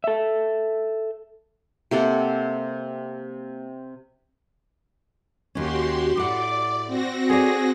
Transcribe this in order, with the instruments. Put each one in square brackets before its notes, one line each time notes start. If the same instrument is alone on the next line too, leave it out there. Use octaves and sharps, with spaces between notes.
[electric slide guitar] A4 E5
[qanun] C3 A#3 A4 F#5
[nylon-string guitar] D#2 C#4 [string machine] F#4 G4 C6
[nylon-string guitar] A2 F#5 [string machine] D5 [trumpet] D6
[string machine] C4 F#4 A#6
[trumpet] G#4 [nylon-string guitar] A4 C#5 D5